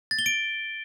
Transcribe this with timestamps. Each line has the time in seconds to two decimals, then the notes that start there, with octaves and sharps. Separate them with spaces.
0.11 A6
0.19 G7
0.26 D7